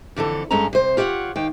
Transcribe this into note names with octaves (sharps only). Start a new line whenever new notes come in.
F2 D3 E3 A4
G2 G#3 C#4 A4 A#5
C3 C5
F4 G4 C#5 E5 F#5
D#2 F5 G5